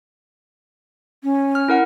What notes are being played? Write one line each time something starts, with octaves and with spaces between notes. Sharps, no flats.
C#4
F6
E4 A#4 F#5